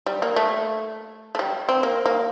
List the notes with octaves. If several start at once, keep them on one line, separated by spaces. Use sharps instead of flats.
G3
A#3
A3
A3
G3
C4
A#3
A#3